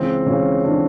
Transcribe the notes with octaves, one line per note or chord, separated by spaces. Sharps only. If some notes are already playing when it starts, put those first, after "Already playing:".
Already playing: C#2 C#3 E3 C4
C#2 C#3 E3 C#4
C#3 E3 D4